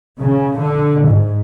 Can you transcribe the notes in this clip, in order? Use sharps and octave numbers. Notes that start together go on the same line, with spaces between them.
C#3
D3
G#2